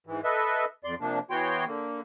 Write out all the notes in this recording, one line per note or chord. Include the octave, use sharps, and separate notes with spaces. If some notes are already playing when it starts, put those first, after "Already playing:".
G#2 E3
A4 B4 D#5 E5
F2 D5 C6
C3 F3 A#3 D4
E3 B3 F#4 C#5 G5 C6
D3 A#3